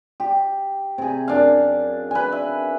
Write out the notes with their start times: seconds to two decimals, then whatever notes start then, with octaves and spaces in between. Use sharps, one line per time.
0.20 G4
0.98 C3 G#4
1.28 F#2 D4 F5
2.11 B4 G#5
2.32 E5